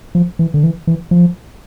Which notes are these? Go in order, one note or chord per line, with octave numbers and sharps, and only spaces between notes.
F3
E3
D3
E3
E3
F3